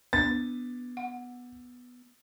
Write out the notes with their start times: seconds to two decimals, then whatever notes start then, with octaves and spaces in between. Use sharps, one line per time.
0.13 B3 D4 A6
0.97 F#5